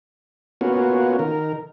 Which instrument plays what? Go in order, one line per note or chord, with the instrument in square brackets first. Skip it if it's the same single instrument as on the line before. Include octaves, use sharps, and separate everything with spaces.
[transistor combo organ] A#3 B3 C#4 F4 F#4
D#3 A#4